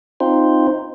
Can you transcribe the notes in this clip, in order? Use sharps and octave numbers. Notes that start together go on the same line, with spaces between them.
C4 D#4 F4 C5